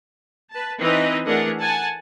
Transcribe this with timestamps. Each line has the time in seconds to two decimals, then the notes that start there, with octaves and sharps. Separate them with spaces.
0.51 B4 A5
0.80 E3 C4 D#4 B4 D#5
1.25 E3 A3 D4 G#4 A#4 F#5
1.59 F#5 G#5 A5